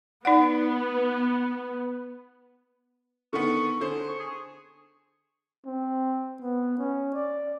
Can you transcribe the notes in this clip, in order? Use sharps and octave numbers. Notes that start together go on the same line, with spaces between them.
B3 D#4 D5 F#5
D3 D#3 B3 C#6
D3 G#4 C5
C#6
G#4
C4
B3
C#4
D5